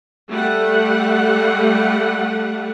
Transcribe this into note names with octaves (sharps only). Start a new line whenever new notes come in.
G3 A3 F#5